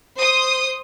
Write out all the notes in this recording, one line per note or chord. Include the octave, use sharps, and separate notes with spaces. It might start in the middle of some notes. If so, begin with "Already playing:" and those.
C5 D#6